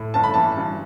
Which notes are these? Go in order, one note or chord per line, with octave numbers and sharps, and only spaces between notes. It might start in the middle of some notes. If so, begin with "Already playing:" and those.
Already playing: A2
G1 A5
B5
E3 A5
G2